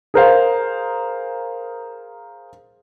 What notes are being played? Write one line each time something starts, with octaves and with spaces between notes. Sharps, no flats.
G#4 A#4 C5 F5